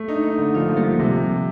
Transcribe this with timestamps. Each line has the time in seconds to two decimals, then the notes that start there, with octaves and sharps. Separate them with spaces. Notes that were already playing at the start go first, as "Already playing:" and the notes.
Already playing: A3
0.08 A#3 D4 D#4
0.24 D#4
0.39 D3
0.54 F3 A#3 D4
0.69 F3
0.77 G3 A#3
0.84 F3
0.99 C3 D#3 G3